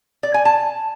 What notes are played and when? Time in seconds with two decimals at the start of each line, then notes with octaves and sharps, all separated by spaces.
0.23 D5
0.34 G#5
0.45 A5